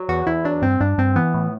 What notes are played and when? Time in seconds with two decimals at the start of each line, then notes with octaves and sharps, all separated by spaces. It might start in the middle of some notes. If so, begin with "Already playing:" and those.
Already playing: F#3
0.09 E2 F#4
0.27 E2 E4
0.44 F#3 D4
0.62 G2 C4
0.80 G2 D4
0.98 G2 C4
1.16 E3 B3
1.34 A2